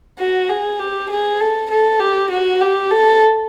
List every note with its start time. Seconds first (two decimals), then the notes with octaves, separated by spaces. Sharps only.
0.19 F#4
0.50 G#4
0.79 G4
1.10 G#4
1.40 A4
1.70 A4
2.00 G4
2.31 F#4
2.61 G4
2.91 A4